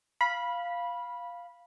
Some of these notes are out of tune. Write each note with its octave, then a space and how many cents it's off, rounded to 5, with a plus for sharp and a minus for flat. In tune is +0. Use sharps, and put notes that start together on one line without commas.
F5 +0 B5 -15